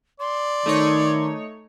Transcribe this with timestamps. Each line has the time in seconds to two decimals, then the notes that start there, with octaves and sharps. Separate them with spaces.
0.20 D5 C6
0.66 D#3 A3 D#4 C#5